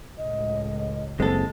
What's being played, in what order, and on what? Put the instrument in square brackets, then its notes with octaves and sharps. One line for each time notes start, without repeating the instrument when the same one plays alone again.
[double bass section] C#2 A2 [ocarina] D#5
[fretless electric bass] F#1 C4 [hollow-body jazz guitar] G#3 A4